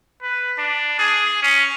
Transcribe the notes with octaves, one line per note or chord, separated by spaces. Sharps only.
B4
D4
G#4
C#4